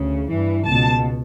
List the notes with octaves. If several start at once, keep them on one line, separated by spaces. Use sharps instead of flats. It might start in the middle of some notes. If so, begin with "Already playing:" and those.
Already playing: D2 C#3
G2 E3
C#2 B2 A5